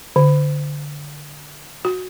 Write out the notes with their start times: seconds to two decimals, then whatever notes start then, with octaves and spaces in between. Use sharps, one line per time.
0.16 D3
1.85 F#4